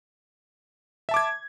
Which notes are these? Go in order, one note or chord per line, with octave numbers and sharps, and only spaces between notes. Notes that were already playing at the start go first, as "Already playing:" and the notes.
E5 A5 D6 G#6